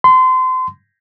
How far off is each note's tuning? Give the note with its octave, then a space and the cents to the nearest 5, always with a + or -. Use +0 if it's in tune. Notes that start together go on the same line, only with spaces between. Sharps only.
C6 -30